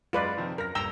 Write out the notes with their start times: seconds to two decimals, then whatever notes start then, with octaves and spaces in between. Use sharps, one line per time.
0.13 F#2 G#3 F4 B4 D5
0.37 C3 D#3 F3
0.58 F#2 A#4 A#6
0.75 D#1 G2 G5 A#5 E6 G7